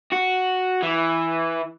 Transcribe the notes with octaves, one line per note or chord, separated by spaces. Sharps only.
F#4
E3